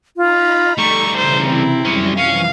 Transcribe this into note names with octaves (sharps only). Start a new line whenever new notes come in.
D#4 F4 A#5 B5
G3 A3 A4 A#5 C#6
C#3 E3 C5
C3 C4 E4
F#2 G3 G#3 C#4 A#6
E3 F3 C#4 F5